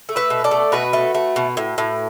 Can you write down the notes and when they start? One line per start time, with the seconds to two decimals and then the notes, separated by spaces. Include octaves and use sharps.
0.09 A3
0.16 B4 E5
0.30 B2
0.44 A4 D5
0.51 A3
0.72 B2 F#4 B4
0.93 A3
1.15 A3
1.36 B2
1.57 A2
1.78 A2